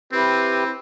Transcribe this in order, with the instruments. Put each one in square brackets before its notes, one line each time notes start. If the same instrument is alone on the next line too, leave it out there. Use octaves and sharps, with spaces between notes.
[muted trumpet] C4 [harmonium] E4 G4 B4